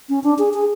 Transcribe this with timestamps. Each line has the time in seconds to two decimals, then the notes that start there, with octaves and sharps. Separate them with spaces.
0.09 C#4
0.24 D4
0.39 G#4
0.54 G#4